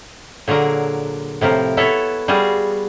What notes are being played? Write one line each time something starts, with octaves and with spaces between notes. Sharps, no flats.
A#2 D3 F#3 G#4 A#4
A2 C3 F3 A#4
B3 E4 A4 C#5
G3 F4 F#4 G#4